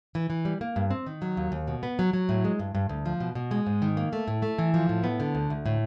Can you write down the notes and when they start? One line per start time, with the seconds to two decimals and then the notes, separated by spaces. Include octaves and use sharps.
0.15 E3
0.30 E3
0.45 G3
0.61 A#3
0.76 G2
0.91 C4
1.06 D#3
1.22 F#3
1.37 D#2
1.52 D#2
1.68 B2
1.83 B3
1.99 F#3
2.13 F#3
2.29 A2
2.44 G#3
2.59 G2
2.75 G2
2.89 D2
3.06 F3
3.20 B2
3.35 B2
3.51 G#3
3.67 G#2
3.82 D#3
3.97 A#3
4.13 A3
4.28 A2
4.42 A3
4.58 E3
4.74 F3
4.89 A2
5.04 B3
5.20 D3
5.35 D2
5.50 D2
5.66 A2